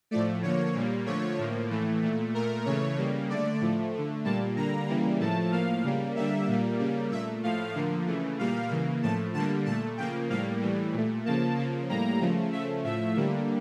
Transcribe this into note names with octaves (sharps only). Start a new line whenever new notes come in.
A2 F3 A3 D5
D3 F3 A#3 C#5
A#2 G3 A#3
D3 F3 A3 C#5
A2 F3 A#3
A2 E3 A3
A#2 A3
A#2 A3 A#4
C#3 E3 A3 C#5
C#3 G3 A#3
D3 A3 D5
A2 F3 A3
D3 A3
A#2 G3 A#3 A5
D3 G3 A#3 A#5
C#3 E3 G3 A#3
A2 F3 A3 A5
A2 F3 A#3 F5
C#3 G3 A#3
D3 G3 A#3 E5
A#2 G3 A#3
C#3 G3 A#3
A#2 A3 E5
A2 F3 A3 F5
D3 F3 A#3
C#3 E3 A3
A#2 G3 A#3 F5
C#3 E3 A#3
A2 F3 A3 A5
D3 G3 A#3 A5
A#2 A3 A5
C#3 F3 A#3 G5
A2 G3 A#3 F5
A2 E3 G3
A#2 A3
C#3 F3 A#3 A5
C#3 F3 A#3
A2 G3 A#3 A#5
C#3 F3 A3
C#3 F3 A3 E5
A2 F3 A3 E5
D3 G3 A#3